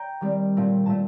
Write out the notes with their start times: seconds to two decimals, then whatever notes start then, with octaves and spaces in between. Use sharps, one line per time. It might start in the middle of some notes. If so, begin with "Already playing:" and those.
Already playing: G5 A#5
0.21 D#3 G3 C4
0.57 A#2 A3 C4
0.86 A#2 A3 A5